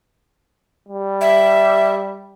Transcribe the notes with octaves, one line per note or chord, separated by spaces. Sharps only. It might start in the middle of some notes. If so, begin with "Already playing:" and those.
G3
E5